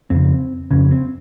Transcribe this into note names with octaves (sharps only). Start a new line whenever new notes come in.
F2 C#3 C4
F2 C#3 C#4
C4